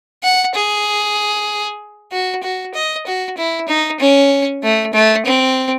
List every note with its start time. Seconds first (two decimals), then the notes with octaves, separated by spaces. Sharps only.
0.23 F#5
0.55 G#4
2.12 F#4
2.43 F#4
2.74 D#5
3.06 F#4
3.37 E4
3.68 D#4
4.00 C#4
4.63 A3
4.93 A3
5.25 C4